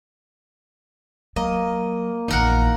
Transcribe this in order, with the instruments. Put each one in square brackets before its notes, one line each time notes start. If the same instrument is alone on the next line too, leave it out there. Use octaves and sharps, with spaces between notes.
[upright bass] F#3 [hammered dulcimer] A#3 [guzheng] D#5
[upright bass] A#1 E2 [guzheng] D#4 A#4 F#5